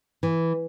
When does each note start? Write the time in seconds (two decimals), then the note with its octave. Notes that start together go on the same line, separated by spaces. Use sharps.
0.23 E3